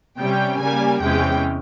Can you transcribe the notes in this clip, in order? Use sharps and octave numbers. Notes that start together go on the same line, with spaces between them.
C3 G3 C#4 G5
C#3 G3 A#3 G#5
E2 C3 E3 G#3 C#4 G5